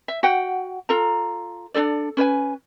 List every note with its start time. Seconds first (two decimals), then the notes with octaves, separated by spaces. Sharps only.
0.08 E5
0.23 F#4 F#5 G5
0.89 F4 A4 A#5
1.74 D4 D#4 A4 D5
2.17 C#4 B4 C#5 G#5